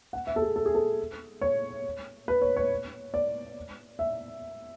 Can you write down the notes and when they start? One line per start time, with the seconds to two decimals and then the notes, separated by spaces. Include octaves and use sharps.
0.13 F#5
0.27 E5
0.36 A4
0.42 G#4
0.56 A4
0.66 G#4
0.75 A4
1.41 C#5
2.28 B4
2.42 C#5
2.56 C#5
3.14 D5
3.99 E5